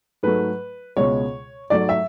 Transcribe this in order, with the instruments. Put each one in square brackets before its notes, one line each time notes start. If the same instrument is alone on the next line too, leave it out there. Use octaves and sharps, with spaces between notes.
[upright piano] G#2 F#3 A3 B4
C#2 B2 G#3 C#5
G#2 F#3 A3 D5
E5